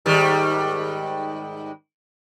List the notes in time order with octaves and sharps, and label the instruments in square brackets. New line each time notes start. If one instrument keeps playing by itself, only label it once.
[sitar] G#2 D#3 G3